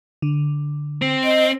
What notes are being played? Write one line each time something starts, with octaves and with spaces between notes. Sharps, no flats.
D3
C4
D#5